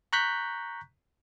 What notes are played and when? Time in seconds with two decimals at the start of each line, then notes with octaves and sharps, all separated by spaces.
0.13 A#5 C#6 F#6 G6 B6